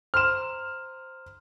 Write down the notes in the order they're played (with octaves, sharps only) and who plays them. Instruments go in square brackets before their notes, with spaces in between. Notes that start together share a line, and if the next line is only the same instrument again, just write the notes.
[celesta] C5 A#5 C6 [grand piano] F6 E7